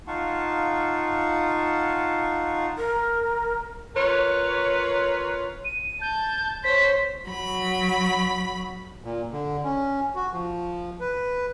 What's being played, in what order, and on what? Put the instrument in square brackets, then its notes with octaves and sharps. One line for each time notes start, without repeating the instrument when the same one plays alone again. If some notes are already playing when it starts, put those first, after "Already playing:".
[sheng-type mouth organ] D#4 F4 F5 F#5 A5 C#6
[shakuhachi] A#4
[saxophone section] F4 A#4 B4 C#5
[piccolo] D#7
[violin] A5 [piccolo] G6
[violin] C5 C#5 [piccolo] B6
[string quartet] F#3 B5
[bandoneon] A#2
D3
C#4
F#4
F3
B4